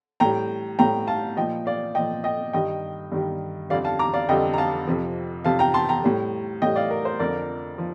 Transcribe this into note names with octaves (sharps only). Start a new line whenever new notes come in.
A2 G3 G5 A#5
A2 G3 G5 A#5
F5 A5
A#2 F3 D#5 G5
D5 F5
A#2 F3 D#5 G5
D#5 G5
G2 D#3 G3 D#5 G5
G2 D#3 G3
F2 D3 G3 D5 F5
F5 A5
A#5 D6
D5 F5
F2 D3 G3 D#5 G5
A#5
F5 A5
F2 C3 F3
F2 C3 F3 F5 A5
G5 A#5
A5 C6
G5 A#5
A2 G3
A2 G3 D#5 G5
D5 F5
A#4
C5
F2 D3 F3 A#4 D5
F3